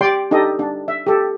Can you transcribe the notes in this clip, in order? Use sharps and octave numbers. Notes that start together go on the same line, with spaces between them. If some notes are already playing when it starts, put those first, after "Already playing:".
G4 D5 G5 C6
D4 D#4 G4 A4 D#5
D4
E5
G4 A4